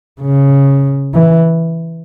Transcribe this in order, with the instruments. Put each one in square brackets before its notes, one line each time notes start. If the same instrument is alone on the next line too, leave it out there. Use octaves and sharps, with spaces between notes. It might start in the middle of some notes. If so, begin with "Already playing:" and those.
[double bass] C#3
E3